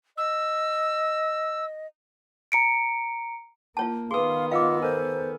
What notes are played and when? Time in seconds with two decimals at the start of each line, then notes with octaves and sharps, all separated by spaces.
0.17 D#5 E6
2.52 A#5 C#7 D7
3.77 A#3 F4 C#5 A5
4.11 D#3 B3 G#4 B4 F5 C6 D#6
4.51 F4 D#5 F5 F#5 D6 E6
4.82 A4 A#4 C5 G#5